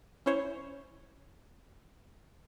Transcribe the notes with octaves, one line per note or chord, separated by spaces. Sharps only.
C#4 E4 C5 C#5